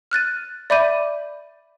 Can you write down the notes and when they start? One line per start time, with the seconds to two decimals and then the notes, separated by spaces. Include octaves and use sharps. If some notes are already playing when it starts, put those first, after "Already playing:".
0.11 F6 F#6 A6 D#7
0.70 D5 E5 B5 D6 G6 D#7